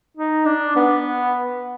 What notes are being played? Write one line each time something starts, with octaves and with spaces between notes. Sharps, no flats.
D#4
D4
B3